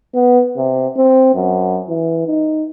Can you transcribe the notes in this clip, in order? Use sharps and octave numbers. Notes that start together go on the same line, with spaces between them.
B3
C3
C4
F#2
E3
D#4